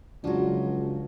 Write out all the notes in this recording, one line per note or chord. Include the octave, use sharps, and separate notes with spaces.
C#2 F3 F#3 D4 F#4